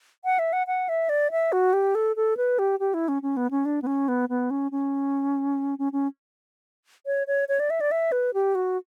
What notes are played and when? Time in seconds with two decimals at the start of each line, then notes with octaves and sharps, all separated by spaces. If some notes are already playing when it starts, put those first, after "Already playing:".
0.24 F#5
0.39 E5
0.53 F#5
0.67 F#5
0.89 E5
1.09 D5
1.31 E5
1.52 F#4
1.73 G4
1.95 A4
2.16 A4
2.37 B4
2.59 G4
2.80 G4
2.94 E4
3.08 C#4
3.22 C#4
3.37 B3
3.51 C#4
3.65 D4
3.82 B3
3.87 C#4
4.08 B3
4.29 B3
4.50 C#4
4.72 C#4
5.79 C#4
5.93 C#4
7.06 C#5
7.27 C#5
7.49 C#5
7.60 D5
7.70 E5
7.81 D5
7.91 E5
8.12 B4
8.34 G4
8.55 F#4